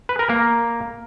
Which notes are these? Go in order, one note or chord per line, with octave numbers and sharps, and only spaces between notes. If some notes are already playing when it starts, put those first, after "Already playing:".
B4
A#4
A#3